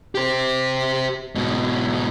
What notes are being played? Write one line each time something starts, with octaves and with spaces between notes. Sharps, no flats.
G4 C5
G#2 B2